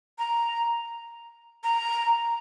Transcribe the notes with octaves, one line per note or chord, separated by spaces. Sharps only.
A#5
A#5